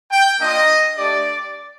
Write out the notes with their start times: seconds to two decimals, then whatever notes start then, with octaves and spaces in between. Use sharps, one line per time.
0.10 G5
0.38 A#3 D4 F4 D#5
0.96 A3 D4 G4 D5